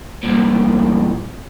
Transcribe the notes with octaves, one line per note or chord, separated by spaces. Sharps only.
C2 A#2